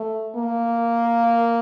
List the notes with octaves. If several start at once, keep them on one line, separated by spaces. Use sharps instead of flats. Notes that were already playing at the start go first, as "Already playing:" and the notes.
Already playing: A3
A#3